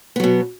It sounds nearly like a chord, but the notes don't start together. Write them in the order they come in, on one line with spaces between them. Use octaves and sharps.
B3 F#3 B2